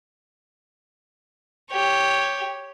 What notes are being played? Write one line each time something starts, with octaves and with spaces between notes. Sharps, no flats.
G4 C#5